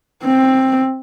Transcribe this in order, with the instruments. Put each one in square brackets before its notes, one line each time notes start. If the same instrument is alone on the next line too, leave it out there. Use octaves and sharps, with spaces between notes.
[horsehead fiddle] C4